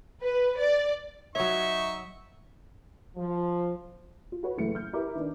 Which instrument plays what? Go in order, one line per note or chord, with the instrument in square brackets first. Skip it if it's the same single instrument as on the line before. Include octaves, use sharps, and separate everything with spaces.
[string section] B4
D5
[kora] F#3 C#5 [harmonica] D#4 C#6 [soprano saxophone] E5
[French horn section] F3
[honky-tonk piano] F4
F#4 B4 C#5
F#1 E3 A3 C#7
F6 G6
E4 G4 A#4 B4 A#5 D6
D#3 D4